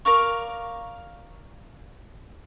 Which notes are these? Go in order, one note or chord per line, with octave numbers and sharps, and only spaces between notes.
A#4 D5 F5 C#6